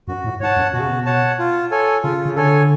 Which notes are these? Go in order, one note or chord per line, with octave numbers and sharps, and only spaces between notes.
F#2 F#4
A2
G#2 C#5 F#5 A5
F#2
B2 F#4
C#3
B2
C#5 F#5 A5
F4
A4 C#5 G#5
C#3 F4
C#3
D3 A4 C#5 G#5